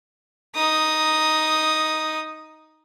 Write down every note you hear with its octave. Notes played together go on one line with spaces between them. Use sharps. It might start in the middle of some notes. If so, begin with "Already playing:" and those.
D#4 D#6